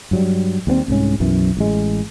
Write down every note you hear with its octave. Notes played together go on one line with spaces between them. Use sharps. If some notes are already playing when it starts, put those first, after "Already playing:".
G2 F#3 G3
D#2 G3 B3 C4
C2 G#2 C#4
B1 F#2 E3
A1 G#3